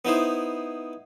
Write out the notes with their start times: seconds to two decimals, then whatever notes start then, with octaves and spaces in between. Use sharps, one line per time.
0.05 B3 D#4 E4 C5